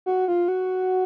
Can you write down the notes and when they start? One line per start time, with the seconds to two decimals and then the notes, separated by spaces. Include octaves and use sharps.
0.06 F#4
0.28 F4
0.48 F#4